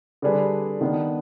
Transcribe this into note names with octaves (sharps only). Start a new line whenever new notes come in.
D3 G3 D4 G#4 B4
D#3 B3 D4